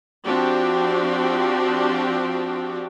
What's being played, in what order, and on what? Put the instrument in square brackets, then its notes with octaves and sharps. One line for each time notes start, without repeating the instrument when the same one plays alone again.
[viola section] F3 C4 D4 F#4 G4